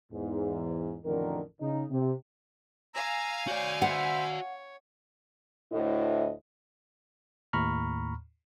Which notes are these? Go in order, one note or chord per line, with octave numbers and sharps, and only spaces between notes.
E2 G#2
A1 F2 D3 D#3 A#4
C#3 D#4
C3
F5 G#5 A#5 E6
F#4 C#5 D5 G6
C5 E5 F#5 B5
C#5
D2 A2 E4 D#5
D#2 A2 A#5 B5 C#6 F6